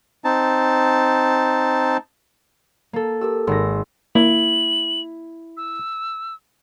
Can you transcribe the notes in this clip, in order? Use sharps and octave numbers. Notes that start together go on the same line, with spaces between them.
C4 D#4 A5
A#3 A4
G4 A4 A#4 E6
G#1 G#4 C6 E6 A#6
A#3 E4 F#7
E6